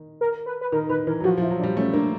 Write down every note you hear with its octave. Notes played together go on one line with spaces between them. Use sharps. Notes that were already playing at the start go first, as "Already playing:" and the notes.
Already playing: D#3
A#4
B4
B4
D#3 A#4
D#3 B4
E3 A#4
F#3
F3 F#4
F3 E4
F#3
D4
G3
A3 C#4
A#3 D4